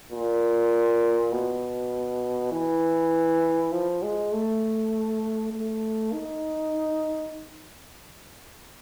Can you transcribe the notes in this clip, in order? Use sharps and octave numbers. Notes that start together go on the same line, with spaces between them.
A#2
B2
E3
F3
G#3
A3
A3
D#4